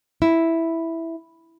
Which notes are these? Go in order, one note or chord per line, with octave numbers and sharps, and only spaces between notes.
E4